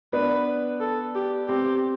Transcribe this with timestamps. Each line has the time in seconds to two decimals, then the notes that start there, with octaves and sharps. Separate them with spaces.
0.13 B3 D4 B4
0.81 A4
1.15 G4
1.49 C4 G4